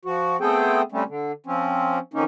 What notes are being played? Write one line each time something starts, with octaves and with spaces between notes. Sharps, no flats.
F3 F#4
A3 B3 C4 G#4 A4 G5
C3 G3 A3 C4 C#4
D3
F3 C4 C#4
F2 D#3 A#3 C#4 D#4